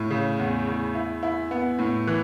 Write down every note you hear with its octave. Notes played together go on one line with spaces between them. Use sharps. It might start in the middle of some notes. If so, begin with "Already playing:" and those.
Already playing: A2
C#3
E2
E2
E4
E4
B3
A2
E3